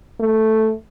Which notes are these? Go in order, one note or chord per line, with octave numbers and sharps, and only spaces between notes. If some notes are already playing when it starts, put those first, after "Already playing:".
A3